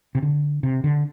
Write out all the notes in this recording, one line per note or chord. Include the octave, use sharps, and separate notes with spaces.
C3
D3
C3
D3